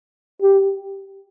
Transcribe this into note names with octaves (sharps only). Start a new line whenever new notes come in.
G4